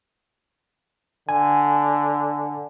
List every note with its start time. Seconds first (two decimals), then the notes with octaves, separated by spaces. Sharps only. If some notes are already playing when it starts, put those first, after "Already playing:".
1.29 D3 G#5